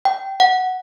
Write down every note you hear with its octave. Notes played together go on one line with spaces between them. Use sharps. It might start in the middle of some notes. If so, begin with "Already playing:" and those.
G5
F#5